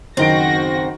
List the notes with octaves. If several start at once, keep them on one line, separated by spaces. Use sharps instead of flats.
F#1 D#3 C4 F#4 A#6 D7